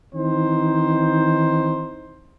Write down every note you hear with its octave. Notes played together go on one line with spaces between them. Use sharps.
D#3 E3 C4 D#4 C5